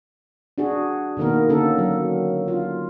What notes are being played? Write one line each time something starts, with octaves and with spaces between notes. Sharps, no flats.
D4 F#4 G#4
B2 D#3 A#3 B3 A#4
D3 A#3 C#4 A4 A#4
F#3
F4